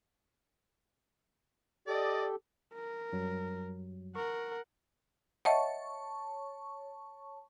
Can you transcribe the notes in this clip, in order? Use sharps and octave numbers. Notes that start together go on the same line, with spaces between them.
G4 A4 D5 D#5
A#4
F#2 F#3 G3
A#4 F#5 C#6
C#5 D#5 E5 F#5 A5 C#6